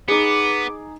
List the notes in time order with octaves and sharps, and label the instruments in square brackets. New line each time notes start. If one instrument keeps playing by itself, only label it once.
[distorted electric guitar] B3 [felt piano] D#4 G#4 [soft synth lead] D6